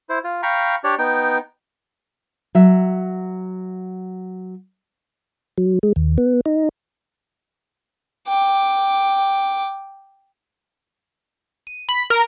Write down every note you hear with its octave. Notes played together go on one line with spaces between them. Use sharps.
E4 C5
F4
F5 G5 A#5 B5 C#6
D4 G4 C#5 D5
B3 D#4 G5
F#3 E5
F#3
G#3
D#2
B3
D#4
G5 D6
D#7
B5
A#4